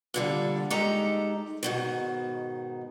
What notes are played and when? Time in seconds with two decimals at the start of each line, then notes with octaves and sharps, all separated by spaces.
0.14 A#2 D3 G3
0.70 G#3 D#4 G4 A4 A#5
1.63 G#2 B2 D#3